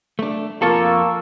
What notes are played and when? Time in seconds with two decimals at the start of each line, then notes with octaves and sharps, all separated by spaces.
0.19 A3 D4
0.62 F2 A#3 F4 A4 A5 C#6 E6